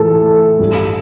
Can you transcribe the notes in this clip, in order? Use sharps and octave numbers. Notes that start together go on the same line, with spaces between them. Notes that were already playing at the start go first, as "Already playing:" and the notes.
Already playing: A2 E3 A4
G2 G3